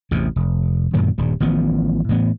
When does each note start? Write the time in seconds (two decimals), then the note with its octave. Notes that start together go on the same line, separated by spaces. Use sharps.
0.11 A1 E2 C3
0.36 F1
0.94 F#2 A#2 D3 D#3
1.18 D#1 G2
1.40 A1 D#3 F3 B3
2.09 A2 E3 B3